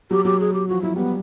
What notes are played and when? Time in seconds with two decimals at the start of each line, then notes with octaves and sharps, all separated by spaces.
0.11 F#3 G4
0.25 F#3 G4
0.40 G#4
0.53 G4
0.68 F3 F#4
0.82 F#3 E4
0.96 G3 B3